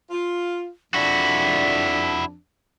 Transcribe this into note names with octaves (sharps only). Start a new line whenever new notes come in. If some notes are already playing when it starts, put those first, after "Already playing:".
F4
F2 D4 E4 F#4 B6